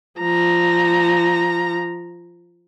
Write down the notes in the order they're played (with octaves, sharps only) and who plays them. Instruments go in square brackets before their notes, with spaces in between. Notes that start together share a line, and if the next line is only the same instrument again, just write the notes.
[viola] F3 A#5